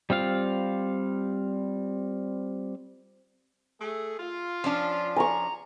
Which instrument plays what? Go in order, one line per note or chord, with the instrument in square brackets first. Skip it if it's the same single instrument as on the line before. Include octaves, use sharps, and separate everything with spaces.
[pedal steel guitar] G3 C4 F4 F5
[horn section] A3 G#4
F4
[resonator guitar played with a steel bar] F3 C#4 D4
[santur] G#5 C#6 [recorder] A#5